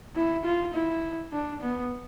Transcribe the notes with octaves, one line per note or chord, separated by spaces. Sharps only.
E4
F4
E4
D4
B3